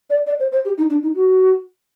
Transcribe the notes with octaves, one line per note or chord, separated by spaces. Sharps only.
D5
D5
C5
C5
G4
D#4
D4
D#4
F#4